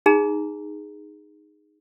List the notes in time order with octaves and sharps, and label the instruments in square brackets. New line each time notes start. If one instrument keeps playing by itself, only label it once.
[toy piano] D#4 G#4 A#5